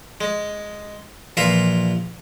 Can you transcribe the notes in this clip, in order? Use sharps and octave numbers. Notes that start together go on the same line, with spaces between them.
G#3
A#1 E3 F4 E5 F5 A#5